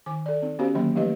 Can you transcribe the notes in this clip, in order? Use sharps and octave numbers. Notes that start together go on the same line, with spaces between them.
D#3 G#5 D6
A4 D5
C4 D#4
B3 C#4 F#4 G4 C5 F5
D3 D#3 F#3 A#3 B5
F3 A3 D#4 G4 B4 D#5